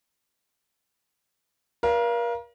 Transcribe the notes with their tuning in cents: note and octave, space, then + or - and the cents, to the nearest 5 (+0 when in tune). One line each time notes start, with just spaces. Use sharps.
A#4 +35 D5 -30 F5 -25